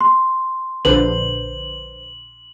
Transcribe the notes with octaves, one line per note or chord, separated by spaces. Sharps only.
C6
A#1 D3 B4 C5 F#7